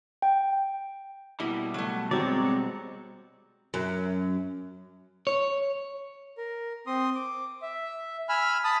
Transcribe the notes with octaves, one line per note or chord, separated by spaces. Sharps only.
G5
B2 G3 A#3 E4
F#3 A3
F#3 G#3 C4 C#5 D5
F#2
C#5
A#4
C4 C6 D#6
D6
E5
G#5 B5 E6 F6
A5 B5 D#6